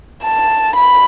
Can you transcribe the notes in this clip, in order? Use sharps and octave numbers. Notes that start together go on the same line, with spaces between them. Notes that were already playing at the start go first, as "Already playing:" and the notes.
A5
B5